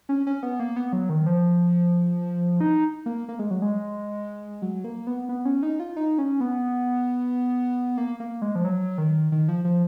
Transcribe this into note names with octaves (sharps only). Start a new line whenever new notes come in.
C#4
C#4
B3
A#3
B3
F#3
D#3
F3
D#4
A#3
A#3
G#3
F#3
G#3
F#3
A#3
B3
B3
C#4
D#4
F4
D#4
C#4
B3
A#3
A#3
G#3
F3
F#3
D#3
D#3
F3
F3